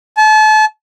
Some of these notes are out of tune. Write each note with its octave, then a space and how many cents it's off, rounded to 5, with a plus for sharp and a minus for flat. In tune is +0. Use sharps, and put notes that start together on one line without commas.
A5 -35